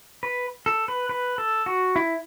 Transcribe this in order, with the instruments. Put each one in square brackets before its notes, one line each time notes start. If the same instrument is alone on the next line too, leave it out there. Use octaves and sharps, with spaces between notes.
[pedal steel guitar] B4
A4
B4
B4
A4
F#4
E4